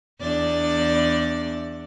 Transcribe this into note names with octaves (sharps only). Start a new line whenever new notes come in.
E2 D4 D5